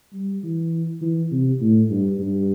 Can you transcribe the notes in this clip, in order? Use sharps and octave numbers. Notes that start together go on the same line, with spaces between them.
G3
E3
E3
C3
A2
G2
G2